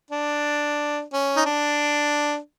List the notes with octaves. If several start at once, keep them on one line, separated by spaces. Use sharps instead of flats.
D4
C#4
D#4
D4